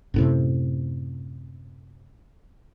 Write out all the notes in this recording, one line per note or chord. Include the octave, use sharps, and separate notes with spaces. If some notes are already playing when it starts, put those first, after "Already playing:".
F#2 A2 C3